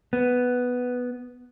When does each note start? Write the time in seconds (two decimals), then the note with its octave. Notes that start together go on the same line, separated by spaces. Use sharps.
0.13 B3